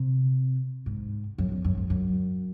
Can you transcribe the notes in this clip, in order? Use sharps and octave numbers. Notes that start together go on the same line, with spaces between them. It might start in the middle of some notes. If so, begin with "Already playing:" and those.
Already playing: C3
G#2
F#2
E2
F#2
G#2
F#2